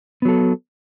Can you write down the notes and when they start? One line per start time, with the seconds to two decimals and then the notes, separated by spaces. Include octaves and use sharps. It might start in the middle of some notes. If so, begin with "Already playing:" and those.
0.22 B3
0.25 F#3
0.28 A4